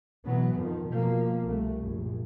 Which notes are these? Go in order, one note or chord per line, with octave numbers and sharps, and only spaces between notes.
B2 E3 F#3 B3
F2 D#3 F3
B2 F3 A#3
C2 A3
A#1 F#2